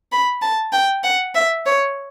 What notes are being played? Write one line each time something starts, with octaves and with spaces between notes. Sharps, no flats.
B5
A5
G5
F#5
E5
C#5